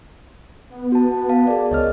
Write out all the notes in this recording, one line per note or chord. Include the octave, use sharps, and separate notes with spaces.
B3
F#4 A5
F5 A5
G#4 A#4 D5
C#2 C#5 D#5 F6